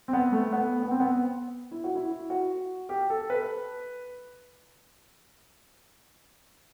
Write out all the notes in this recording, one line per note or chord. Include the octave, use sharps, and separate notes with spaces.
C4
B3
A3
B3
B3
C4
B3
E4
F#4
E4
F#4
G4
A4
B4